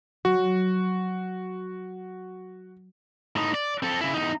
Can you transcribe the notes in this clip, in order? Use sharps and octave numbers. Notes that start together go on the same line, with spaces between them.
F#3 F#4
A2 D#4
D5
C4 A4
C#3 E4
E2 D#4